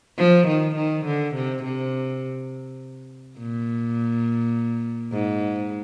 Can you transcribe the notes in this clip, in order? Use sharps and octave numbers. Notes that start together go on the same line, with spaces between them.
F3
D#3
D#3
D3
C3
C3
A#2
G#2